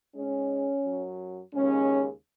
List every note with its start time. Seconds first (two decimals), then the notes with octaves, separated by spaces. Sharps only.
0.15 G#2 G#3 C#4
0.84 F#2 F#3
1.53 D#2 C#3 G#3 C#4